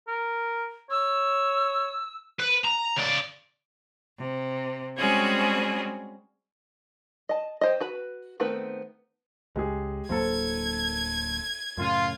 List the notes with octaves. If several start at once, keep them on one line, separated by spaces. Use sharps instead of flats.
A#4
C#5 E6
B4
A#5
C#3 D5
C3
G3 G#3 C4 C#4 F#4 G#4
D#5 A5
G4 C5 D#5
F#4 B4 B5
D#3 A3 B3 C4 B4
C#2 G#3 G4 G#4
D1 F#3 A#3 A4 C5 G#6
F#2 A2 C#3 F4